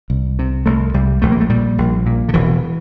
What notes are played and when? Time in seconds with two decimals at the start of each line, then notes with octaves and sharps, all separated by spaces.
0.10 C2
0.39 C3
0.66 C2 A3
0.94 C2 G3
1.22 A#1 A3
1.32 A#3
1.40 A3
1.50 A#2 G3
1.78 A#1
2.06 A#2
2.29 D3
2.34 E1 E3